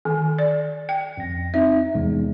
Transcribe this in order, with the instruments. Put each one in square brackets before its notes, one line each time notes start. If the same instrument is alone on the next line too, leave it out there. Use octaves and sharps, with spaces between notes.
[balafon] D#3
D5
G5
[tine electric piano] F2 A#6
[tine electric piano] C4 D#4 [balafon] E5
[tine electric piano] E2 C3 G#3